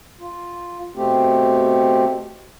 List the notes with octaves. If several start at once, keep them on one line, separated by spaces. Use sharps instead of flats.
F4
B2 A3 C4 G4